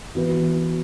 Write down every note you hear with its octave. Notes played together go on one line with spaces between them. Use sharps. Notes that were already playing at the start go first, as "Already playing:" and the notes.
E3 B3 F#4 B4